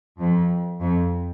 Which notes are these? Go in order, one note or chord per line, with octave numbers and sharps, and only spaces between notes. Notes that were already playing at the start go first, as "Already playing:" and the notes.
F2
F2